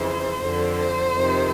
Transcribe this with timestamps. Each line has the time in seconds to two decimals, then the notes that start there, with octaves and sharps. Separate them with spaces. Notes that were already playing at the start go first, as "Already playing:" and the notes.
Already playing: F2 C#3 E3 C5
0.42 F2 D3
0.78 C5
1.15 F2 C3 D#3